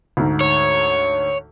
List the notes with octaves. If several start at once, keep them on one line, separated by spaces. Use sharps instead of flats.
D2 G#2
C#5